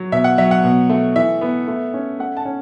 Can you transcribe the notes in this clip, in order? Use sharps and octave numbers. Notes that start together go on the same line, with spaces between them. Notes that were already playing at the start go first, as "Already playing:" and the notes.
Already playing: F#3
B2 E5
F#5
F#3 E5
F#5
B2
A3
E3 E5
B3
A3
C#4
A3 F#5
A5
C#4